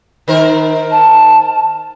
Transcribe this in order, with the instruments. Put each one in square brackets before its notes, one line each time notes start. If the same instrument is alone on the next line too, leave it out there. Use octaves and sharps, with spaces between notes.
[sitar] D#3 A#4 C5 [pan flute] D#4
[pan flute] A5